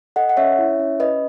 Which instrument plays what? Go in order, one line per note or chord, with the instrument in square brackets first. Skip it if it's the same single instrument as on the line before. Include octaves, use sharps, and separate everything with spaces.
[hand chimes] A4 D#5 F#5
F#5
C#4 C#5 E5
E4
C#4
C#4 B4 D#5